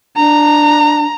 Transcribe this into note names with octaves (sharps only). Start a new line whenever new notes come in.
D4 A#5